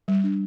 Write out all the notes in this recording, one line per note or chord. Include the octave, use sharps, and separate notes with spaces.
G3
D4